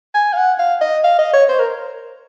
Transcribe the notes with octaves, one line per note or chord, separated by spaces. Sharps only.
G#5
F5
F#5
F5
D#5
F5
D#5
C#5
C5
A#4